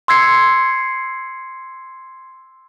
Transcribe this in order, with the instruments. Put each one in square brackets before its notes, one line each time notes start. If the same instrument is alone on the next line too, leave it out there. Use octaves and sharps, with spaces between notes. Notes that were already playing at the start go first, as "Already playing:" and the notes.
[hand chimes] C6 E6 G#6 C7 C#7